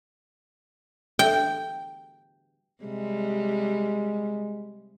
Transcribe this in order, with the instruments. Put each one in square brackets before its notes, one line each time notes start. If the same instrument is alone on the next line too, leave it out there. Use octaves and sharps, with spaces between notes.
[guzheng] G5
[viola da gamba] C3 G3 [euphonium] G#3